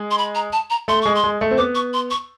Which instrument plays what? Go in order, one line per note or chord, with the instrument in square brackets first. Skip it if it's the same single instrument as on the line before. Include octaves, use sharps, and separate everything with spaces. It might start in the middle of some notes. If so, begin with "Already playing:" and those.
Already playing: [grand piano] G#3
[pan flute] C6
B5
A#5
A5
A#5
[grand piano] A3 [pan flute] C6
[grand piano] G#3 [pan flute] C#6
[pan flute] C6
[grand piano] G#3
A3
C4
[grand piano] B3 [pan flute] D6
[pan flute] C#6
C6
C#6